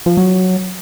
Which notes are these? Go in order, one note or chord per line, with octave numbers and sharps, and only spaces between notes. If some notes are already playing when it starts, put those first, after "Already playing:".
F3
F#3